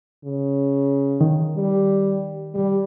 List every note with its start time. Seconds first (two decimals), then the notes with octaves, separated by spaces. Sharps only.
0.24 C#3
1.21 D#3
1.56 G3
2.54 G3